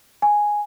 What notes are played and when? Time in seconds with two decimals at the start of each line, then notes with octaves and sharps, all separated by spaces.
0.22 G#5